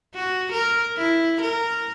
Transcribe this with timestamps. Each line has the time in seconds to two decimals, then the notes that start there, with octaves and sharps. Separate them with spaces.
0.15 F#4
0.52 A#4
0.97 E4
1.41 A#4